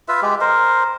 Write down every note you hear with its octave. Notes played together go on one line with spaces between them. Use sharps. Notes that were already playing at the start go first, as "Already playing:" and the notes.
F4 B4 E5
G#3 G4
A#4 C5